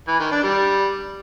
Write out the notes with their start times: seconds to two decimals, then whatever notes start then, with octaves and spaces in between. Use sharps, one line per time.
0.08 E3
0.20 D#3
0.31 D4
0.43 G3